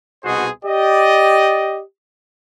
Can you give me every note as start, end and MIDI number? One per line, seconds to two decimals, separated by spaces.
0.24 0.49 36
0.24 0.49 47
0.24 0.49 63
0.24 0.49 66
0.24 0.49 68
0.24 0.49 72
0.65 1.81 67
0.65 1.81 74
0.65 1.81 75